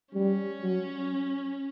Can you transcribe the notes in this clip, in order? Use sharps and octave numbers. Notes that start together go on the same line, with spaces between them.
G3 C#4
F#3